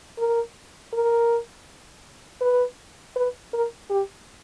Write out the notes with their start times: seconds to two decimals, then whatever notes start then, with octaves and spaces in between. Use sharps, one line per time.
0.18 A#4
0.93 A#4
2.41 B4
3.16 B4
3.54 A#4
3.90 G4